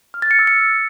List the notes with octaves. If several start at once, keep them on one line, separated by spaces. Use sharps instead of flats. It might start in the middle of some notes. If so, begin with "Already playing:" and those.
F6
A6
C#7
E6
C#7